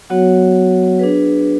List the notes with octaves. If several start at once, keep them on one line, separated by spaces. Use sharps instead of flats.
F#3 B3 F#4 C#5 F#5
D4 G#4 B4